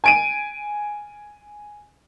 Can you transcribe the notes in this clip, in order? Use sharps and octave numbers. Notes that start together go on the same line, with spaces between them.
G#5 D7 D#7